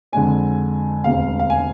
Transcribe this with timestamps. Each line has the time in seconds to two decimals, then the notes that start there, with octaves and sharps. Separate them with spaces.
0.12 F2 D3 G#3 D4 G#5
1.04 E1 D2 C3 F5
1.39 F5
1.50 G#5